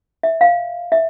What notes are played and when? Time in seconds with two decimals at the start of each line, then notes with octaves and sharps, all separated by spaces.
0.23 E5
0.41 F5
0.92 E5